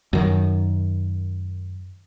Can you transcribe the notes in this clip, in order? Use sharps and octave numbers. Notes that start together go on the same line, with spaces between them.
F#2 D#3